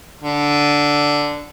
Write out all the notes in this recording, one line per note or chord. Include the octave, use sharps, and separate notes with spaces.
D3